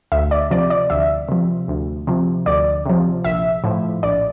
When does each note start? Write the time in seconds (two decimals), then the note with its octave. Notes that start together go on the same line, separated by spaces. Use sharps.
0.12 D2 E5
0.31 D5
0.51 C3 F3 D5
0.70 D5
0.90 D2 E5
1.29 C3 F3
1.68 D2
2.07 C3 F3
2.46 D2 D5
2.86 C3 F3
3.24 A#1 E5
3.64 A2 F3
4.03 A#1 D5